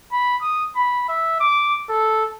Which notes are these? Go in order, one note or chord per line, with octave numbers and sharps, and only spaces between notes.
B5
D#6
B5
E5
D6
A4